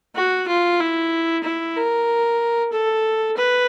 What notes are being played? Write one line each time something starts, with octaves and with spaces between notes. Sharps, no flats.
F#4
F4
E4
E4
A#4
A4
B4